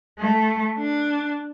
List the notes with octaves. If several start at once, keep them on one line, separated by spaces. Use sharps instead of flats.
A3
D4